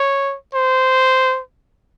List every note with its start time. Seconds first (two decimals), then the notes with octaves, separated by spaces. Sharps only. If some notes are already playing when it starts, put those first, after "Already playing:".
Already playing: C#5
0.54 C5